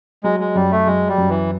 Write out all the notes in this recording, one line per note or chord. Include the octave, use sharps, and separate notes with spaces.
F#3 G#3
G#3
F#2 G3
A3
F#3 G#3
G3
F#2
E3